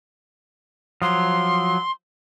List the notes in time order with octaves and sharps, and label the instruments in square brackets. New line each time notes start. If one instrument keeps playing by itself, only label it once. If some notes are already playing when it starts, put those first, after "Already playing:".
[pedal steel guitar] F3 F#3 [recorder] C6